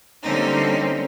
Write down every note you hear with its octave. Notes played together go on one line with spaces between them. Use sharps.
D3 G3 A#3 C4 C#4 D#4